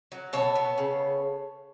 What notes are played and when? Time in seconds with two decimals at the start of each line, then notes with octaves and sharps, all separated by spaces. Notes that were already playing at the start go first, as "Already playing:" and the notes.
0.12 F#3
0.33 B2 A4 C#5
0.55 B3
0.78 C#3